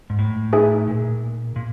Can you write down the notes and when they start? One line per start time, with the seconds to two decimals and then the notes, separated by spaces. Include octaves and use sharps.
0.10 G#2
0.19 A2
0.53 D#4 G#4 B4 E5 G#5
0.88 A#2
1.56 A#2